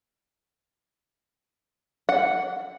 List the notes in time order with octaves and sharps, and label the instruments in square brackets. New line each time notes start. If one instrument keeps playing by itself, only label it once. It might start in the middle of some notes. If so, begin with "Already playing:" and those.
[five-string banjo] F#5